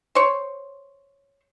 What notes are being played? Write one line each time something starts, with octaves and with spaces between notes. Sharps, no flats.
C5 C#5